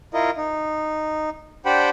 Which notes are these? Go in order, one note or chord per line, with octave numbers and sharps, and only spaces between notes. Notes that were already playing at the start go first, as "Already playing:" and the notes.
E4 F4 A#4 D#5
D#4
D4 G4 C5 F#5 G5 B5